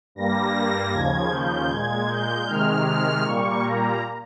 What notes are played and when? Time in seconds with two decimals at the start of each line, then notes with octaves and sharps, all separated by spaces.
0.15 G2 G3 A#3 A#6
0.92 D#2 C#3 F3 G#6
1.31 G6
1.69 A#2 G#3 G#6
2.08 G6
2.46 C3 D#3 G#3 F6
2.85 F6
3.23 A#2 G3 A#3 C#6
3.61 A#5